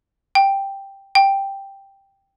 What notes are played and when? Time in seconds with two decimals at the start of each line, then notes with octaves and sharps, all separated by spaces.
0.35 G5
1.15 G5